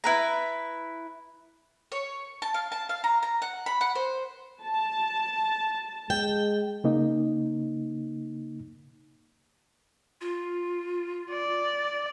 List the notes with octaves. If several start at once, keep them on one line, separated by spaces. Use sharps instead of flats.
E4 B4 A#5
C#5
A5
F5
A5
F5
A#5
A#5
F#5
B5
F#5
C5
A5
G#3 G5
C#3 A#3 D#4
F4
D5